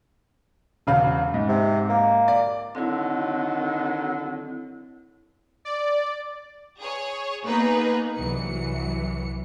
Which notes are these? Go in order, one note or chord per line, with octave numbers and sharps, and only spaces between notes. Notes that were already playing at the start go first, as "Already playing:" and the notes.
E1 C#3 F5
G#2
C3
A#3
D5
D3 D#3 F#3 C4 E4
D5
G#4 C#5
A#3 B3 D#4 G#4 B4
C2 E3 F#3 C#7